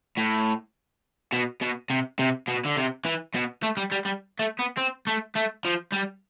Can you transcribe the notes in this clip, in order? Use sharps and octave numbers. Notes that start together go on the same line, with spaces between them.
A2
B2
B2
C3
C3
B2
D3
C3
E3
B2
A3
G3
G3
G3
A3
B3
C4
A3
A3
F3
G3